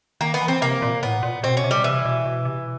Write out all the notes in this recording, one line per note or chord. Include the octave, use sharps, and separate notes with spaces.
D#3 A#3
B3
E3
C4
C3 A#3
A#2
A2 B3
A#2
B2 C4
C#4
C3
G3
C3 E3
B2
B2
C3